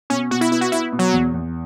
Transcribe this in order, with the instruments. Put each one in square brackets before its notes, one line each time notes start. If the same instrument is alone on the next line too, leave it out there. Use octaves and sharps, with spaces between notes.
[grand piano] B2 [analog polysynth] C#4
[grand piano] B2 [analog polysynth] F#4
[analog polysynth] E4
[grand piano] B3 [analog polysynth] E4
[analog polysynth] F#4
[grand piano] B3 [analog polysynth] E4
[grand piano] B2
[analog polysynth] F#3
[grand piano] E2
E2